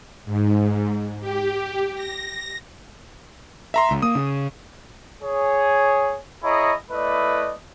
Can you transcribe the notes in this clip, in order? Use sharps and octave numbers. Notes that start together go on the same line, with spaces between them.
G#2
G4
A#6
E5 A#5 C6
C#2
A#3 D#6
C#3
G#4 C#5
E4 G#4 C#5 D#5 A#5 B5
A3 E4 B4 D5 D#5